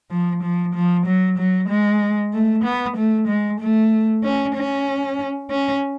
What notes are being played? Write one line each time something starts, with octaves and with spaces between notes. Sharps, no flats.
F3
F3
F3
F#3
F#3
G#3
A3
B3
A3
G#3
A3
C#4
C#4
C#4